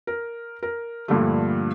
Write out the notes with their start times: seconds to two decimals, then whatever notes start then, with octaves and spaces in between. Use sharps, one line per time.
0.07 A#4
0.63 A#4
1.08 G2 A#2 D3 F3 G3 A3